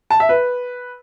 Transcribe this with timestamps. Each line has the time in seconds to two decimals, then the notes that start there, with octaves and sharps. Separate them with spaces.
0.10 A5
0.20 E5
0.29 B4